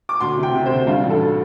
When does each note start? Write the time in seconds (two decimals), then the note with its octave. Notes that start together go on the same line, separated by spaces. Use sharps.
0.09 D6
0.20 D2 C6
0.38 C3
0.43 G5
0.55 C3
0.66 C5
0.71 D2
0.87 G2 F4
1.04 A1
1.10 A4